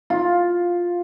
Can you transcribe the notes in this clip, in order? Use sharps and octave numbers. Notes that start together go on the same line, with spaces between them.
F4